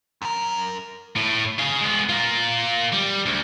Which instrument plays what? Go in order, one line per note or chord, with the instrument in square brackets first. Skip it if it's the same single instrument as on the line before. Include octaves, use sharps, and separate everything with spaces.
[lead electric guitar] F#2 A#4
[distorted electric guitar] A2
G#4 F5
G#3 B3
F4 A#4
G3
D2